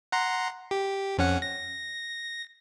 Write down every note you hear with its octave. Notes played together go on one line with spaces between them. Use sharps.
F#5 A#5 C6
G4
F2 C#4 F#5
A#6